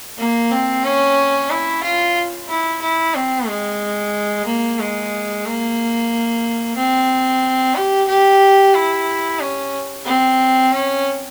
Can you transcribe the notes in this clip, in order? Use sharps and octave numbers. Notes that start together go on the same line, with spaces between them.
A#3
C4
C#4
E4
F4
E4
E4
C4
G#3
A#3
G#3
A#3
C4
G4
G4
E4
C#4
C4
C#4